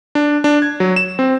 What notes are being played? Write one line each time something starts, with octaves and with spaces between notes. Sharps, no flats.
D4
D4
G#6
F#3
E7
C4